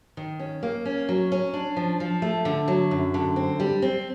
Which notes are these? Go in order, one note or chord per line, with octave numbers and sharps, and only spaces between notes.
D#3
C#4
A#3
C#4
F#3
C#4
D4
F3
F3
A3
D3
F#3
F#2
D3
C4
G3
C4